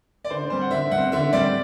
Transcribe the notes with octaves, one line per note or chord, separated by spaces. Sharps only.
D5
D3 C5
G3 C4 C5
F#5
D3 E5
G3 F#5
C4
D3 E5
G3 C4 D5